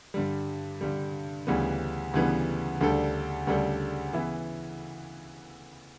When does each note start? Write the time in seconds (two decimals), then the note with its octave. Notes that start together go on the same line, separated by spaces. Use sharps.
0.14 G2 D3 G3
0.81 G2 D3 G3
1.47 D2 C#3 E3 G3 B3
2.14 D2 C#3 E3 G3 B3
2.81 D2 C#3 G3 D4 A4
3.47 D2 C#3 G3 D4 A4
4.13 C#3 E3 B3 E4